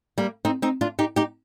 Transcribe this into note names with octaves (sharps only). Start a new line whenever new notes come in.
G3 A#3
C4 D#4
C4 D#4
D4 F4
D#4 G4
D#4 G4